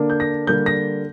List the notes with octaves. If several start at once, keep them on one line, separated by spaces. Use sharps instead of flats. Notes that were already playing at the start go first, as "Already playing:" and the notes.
Already playing: D3 A#3 D4
G6
A#6
D3 G3 A#3 G6
A#6